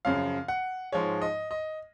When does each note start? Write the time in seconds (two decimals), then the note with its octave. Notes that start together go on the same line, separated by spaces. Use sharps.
0.05 F#2 C#3 F3 F5
0.48 F#5
0.92 G#2 F3 G#3 C#5
1.22 D#5
1.51 D#5